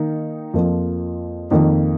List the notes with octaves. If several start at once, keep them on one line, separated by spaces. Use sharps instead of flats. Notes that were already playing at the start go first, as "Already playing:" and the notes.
Already playing: D#3 A#3 D#4
F2 F3 A#3 F4
F2 D#3 A#3